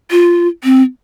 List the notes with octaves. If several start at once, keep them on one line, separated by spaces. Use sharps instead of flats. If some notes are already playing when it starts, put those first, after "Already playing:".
F4
C4